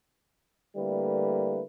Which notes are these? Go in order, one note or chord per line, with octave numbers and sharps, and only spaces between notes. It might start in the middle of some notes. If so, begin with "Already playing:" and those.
D3 G3 A3 A#3 E4 B4